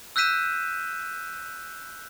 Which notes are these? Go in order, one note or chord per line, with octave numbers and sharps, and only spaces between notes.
E6 F#6 G6 B6 D#7 E7